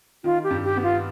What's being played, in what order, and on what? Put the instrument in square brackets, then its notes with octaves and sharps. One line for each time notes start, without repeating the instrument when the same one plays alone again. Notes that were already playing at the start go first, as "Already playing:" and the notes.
[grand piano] D#3 [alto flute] F4
[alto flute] G4
[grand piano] G2
[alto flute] G4
[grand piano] B3
[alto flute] F4